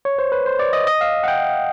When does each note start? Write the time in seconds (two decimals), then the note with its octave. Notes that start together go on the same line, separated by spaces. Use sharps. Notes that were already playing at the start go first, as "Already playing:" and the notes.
0.05 C#5
0.19 C5
0.32 B4
0.46 C5
0.59 D5
0.73 D#5
0.87 D#5
1.01 F5
1.24 F#5
1.28 G5